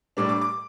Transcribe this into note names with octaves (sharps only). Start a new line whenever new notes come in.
A2 G3 D4 D6
D6
D6